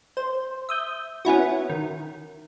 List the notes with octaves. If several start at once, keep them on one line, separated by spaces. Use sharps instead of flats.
C5
E5 D#6 G6
B3 C#4 E4 F#4
D#3